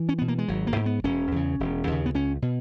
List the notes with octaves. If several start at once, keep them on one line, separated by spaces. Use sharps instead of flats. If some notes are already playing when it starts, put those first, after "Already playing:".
Already playing: E3
C#4
B2 B3
A#3
G#3
G#1 F#3
A#3
G#2
B3
E1 C#4
E2 C#3
E1
D#2 C#3
B3
C#2 C#4
B2